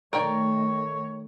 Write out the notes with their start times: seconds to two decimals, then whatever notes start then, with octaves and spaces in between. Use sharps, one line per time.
0.13 D#3 A3 A#4 C#5 D5 G5